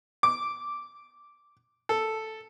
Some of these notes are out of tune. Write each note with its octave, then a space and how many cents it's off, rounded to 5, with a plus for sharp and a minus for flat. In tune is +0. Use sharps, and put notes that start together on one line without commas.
D6 -5
A4 +0